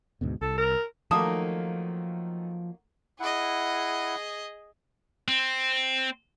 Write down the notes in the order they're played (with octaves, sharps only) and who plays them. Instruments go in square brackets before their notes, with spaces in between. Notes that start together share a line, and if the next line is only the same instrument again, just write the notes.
[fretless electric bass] D2 G#2 B2
[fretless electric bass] C2 [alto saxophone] A4
[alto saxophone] A#4
[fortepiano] D#3 A3 [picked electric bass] F3 [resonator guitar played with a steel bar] F#3 A#3 D#4 [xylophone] A5 D#6
[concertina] E4 F#5 [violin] G#4 D#5
[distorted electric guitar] C4